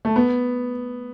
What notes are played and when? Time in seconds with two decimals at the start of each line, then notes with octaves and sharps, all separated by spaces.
0.05 A3
0.16 B3